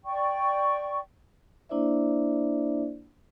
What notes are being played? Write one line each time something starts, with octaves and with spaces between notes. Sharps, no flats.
D5 G5 C#6
A#3 D4 E4 C5 D5 E5